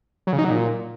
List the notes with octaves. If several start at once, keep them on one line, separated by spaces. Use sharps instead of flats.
F#3
C#3
D#4
F#3
A#2